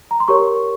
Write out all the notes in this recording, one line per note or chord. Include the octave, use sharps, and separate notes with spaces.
A#5
C6
G4 A#4 C#5 C#6